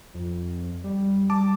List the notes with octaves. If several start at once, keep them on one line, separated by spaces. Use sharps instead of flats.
F2
G3
G3 A5 D6